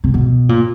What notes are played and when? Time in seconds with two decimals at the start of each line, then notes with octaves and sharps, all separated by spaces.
0.04 C3
0.14 B2
0.49 A#2